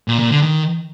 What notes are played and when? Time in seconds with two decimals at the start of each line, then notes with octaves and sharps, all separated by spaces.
0.08 A#2
0.19 A#2
0.31 D3
0.42 D#3